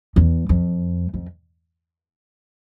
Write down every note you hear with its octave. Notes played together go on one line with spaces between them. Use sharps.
E2
F2
F2